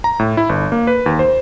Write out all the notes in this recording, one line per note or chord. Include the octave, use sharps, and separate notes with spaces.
A#5
A2
E4
G1
A#3
B4
D#2
C5